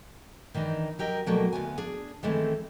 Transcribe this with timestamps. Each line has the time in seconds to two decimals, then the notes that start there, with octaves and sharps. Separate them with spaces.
0.54 D#3 E3 D4 D#4
0.99 F#3 G4 A#4 D#5
1.26 B2 F#3 G3 A3 A#3
1.53 D2 B3 G#5
1.78 D4 G#4
2.23 D#3 E3 G#3 A3 C4 C#4